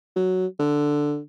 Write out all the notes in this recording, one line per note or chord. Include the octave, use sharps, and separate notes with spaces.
F#3
D3